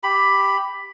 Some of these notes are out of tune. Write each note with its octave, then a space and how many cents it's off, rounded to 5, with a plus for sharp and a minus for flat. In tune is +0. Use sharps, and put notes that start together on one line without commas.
G4 +0 B5 +5